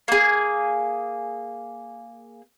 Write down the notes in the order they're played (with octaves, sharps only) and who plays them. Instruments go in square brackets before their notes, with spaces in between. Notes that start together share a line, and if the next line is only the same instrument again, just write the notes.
[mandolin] A#3 G#4